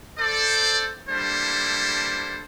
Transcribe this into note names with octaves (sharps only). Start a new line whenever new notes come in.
A4 C5 D5
G3 A#3 D4 E4 A4 C5